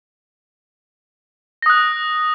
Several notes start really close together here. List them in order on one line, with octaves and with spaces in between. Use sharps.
A#6 D#6 F#6